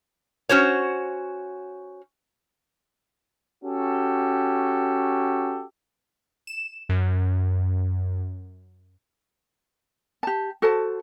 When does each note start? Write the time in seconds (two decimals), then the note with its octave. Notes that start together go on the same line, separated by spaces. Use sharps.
0.49 C#4 F#4 C5 C#5
3.64 C#4 F#4 G4 A4
6.47 E7
6.89 F#2
10.23 G4 A5
10.62 F#4 A4 C5 A5